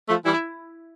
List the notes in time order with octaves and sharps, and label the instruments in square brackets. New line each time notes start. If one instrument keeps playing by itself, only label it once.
[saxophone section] F3 A3
[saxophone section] E3 G3 [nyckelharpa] E4